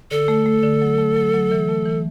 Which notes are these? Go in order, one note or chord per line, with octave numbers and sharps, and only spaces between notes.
D3 A4
A3
A3
D3
F#3
A3
F#3
F#3
E3
A3
E3